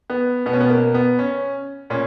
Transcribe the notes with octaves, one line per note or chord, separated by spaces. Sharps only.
B3
B2 B3
C#4
B3
A#3
B3
C#4
A#2 C#4